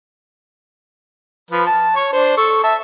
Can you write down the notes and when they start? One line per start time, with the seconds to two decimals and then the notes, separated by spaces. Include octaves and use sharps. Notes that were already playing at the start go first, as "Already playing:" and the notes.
1.51 F3 B4
1.66 A5
1.96 C#5 C#6
2.13 D4 C5
2.37 A4 C#6
2.63 E5 A5